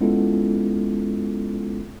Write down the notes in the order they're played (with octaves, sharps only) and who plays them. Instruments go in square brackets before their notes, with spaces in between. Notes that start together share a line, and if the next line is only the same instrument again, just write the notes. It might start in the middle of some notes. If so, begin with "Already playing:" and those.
[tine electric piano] G#3 B3 C#4 E4 F4 A4